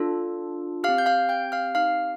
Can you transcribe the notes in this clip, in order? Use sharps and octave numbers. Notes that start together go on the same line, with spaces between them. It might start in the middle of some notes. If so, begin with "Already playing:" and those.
Already playing: D4 F4 A4
G4 F5 F6
C4
G6
F5 F6
G5 G6
F5 F6
C4 D#4 G4 F5 F6